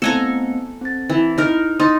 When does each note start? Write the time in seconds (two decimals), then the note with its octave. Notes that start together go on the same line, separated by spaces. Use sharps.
0.02 A3 B3 C4 A4 G#5 A#5
0.81 C4 A6
1.10 E3
1.38 D#4 A#4
1.80 D#4 C6 D#6 A6